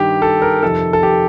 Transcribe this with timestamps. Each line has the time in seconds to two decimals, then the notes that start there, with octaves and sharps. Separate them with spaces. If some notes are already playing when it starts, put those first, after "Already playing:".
Already playing: G2 D#3 G4
0.22 A4
0.42 A#4
0.63 F2 C3 D#3 A4
0.93 A4
1.03 G4